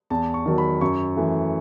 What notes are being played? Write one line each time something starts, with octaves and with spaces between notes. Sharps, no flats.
E2 A5
C#6
D#3 F#3 A5
B5
F#2 C#6
E3 A3